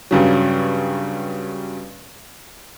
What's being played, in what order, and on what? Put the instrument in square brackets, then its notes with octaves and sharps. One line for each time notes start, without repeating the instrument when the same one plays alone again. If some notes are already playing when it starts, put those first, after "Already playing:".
[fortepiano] G2 C#3 F#3